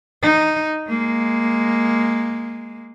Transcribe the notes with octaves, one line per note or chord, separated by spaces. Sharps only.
D#4
G#3 A#3